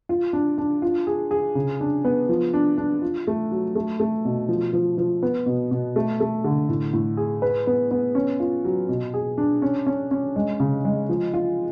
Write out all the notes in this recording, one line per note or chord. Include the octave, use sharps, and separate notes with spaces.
F4
D4
D4
F4
G#4
G#4
C#3
D4
B3
F3
D4
D4
F4
A3
F#3
A3
A3
B2
F3
F3
F3
B3
B2
B2
A3
A3
D3
A2
A2
G#4
B4
B3
B3
C#4
F4
F#3
B2
G#4
D4
C#4
C#4
C#4
G#3
C#3
G#3
F3
F4